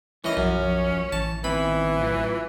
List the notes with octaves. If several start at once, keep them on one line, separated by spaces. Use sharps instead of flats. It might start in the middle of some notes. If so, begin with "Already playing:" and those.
E3 C#4 E4 A#4 D#5
B1 F#2 F3
F3
A1 E3 A5
D#3 E3 B3 C4 B5
A2 F#3 F4